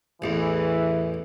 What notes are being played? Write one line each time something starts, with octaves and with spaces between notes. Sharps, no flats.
A1 E2 E3